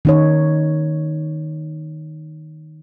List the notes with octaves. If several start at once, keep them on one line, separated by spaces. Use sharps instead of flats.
D#3 D#4 C#5